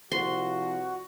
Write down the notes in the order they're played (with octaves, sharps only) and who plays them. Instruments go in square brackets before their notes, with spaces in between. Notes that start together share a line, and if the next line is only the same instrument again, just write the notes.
[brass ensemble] C2 F3 [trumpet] F#4 [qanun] C6